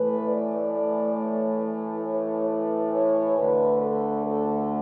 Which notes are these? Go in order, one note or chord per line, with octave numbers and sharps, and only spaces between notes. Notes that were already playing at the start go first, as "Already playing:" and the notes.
Already playing: A2 E3 A3 B4
D5
D5
C#5
C#5
B4
C#5
D2 D3 A3 B4
A4
A4